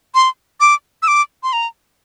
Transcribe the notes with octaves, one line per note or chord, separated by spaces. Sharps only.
C6
D6
E6
D6
C6
A#5